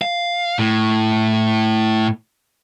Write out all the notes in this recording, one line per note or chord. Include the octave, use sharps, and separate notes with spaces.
F5
A2